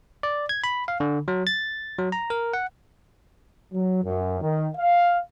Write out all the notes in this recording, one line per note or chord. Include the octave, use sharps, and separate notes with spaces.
D5
G#6
B5
F5
D3
F#3
A6
F#3
A#5
A#4
F#5
F#3
F#2
D#3
F5